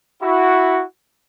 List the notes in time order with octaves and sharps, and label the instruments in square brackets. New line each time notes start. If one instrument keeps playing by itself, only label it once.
[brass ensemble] E4 F#4